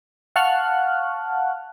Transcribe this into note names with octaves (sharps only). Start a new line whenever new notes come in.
F5 F#5 A5 C#6 F6 F#6